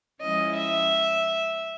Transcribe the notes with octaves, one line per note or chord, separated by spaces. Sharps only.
F3 G#3 C#4 E4 D#5
E5